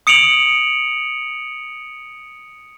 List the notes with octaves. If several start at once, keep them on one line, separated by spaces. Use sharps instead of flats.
D#6 C#7 D7 F7 F#7